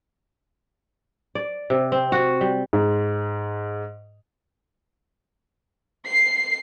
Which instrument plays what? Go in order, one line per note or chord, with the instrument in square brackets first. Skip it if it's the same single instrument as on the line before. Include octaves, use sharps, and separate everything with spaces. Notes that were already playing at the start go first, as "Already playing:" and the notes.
[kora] D5
C3
C4
F#4
G3
[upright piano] G#2
[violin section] C7